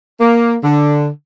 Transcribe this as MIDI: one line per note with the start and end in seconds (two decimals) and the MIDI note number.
0.21 0.55 58
0.63 1.07 50